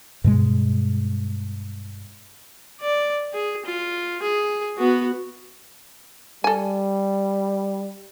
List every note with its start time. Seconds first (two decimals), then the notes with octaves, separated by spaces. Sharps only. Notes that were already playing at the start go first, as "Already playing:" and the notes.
0.24 G2 B2 G#3
2.80 D5
3.33 G#4
3.65 F4
4.23 G#4
4.78 B3 F#4
6.44 G3 A4 G#5